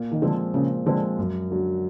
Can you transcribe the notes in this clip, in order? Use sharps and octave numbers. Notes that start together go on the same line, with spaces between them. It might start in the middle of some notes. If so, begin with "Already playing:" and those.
Already playing: A#2
D#3
D3 F3 G#3 C4
A#2 C#3
D3 F3 G#3 C4
F#2
D3 F#3